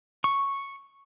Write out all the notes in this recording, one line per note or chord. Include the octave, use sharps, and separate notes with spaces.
C#6